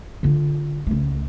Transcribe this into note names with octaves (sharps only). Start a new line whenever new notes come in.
D3 F4
C#2 A3